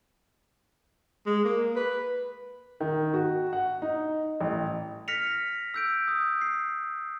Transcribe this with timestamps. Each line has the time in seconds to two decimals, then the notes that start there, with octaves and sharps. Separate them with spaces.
1.26 G#3
1.45 A#3
1.76 B4
2.80 D#3
3.14 F#4
3.53 F#5
3.82 D#4
4.41 A1
5.08 F6 A#6 B6 C#7 F7
5.74 E6 G6 D7
6.08 D#6
6.41 C7